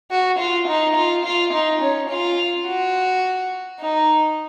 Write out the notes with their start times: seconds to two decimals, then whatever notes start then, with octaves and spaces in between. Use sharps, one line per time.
0.11 F#4
0.39 F4
0.67 D#4
0.96 F4
1.24 F4
1.53 D#4
1.81 C#4
2.09 F4
2.66 F#4
3.80 D#4